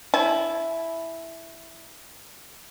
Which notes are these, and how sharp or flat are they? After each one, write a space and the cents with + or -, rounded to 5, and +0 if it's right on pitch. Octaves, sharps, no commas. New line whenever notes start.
E4 +0 A5 -45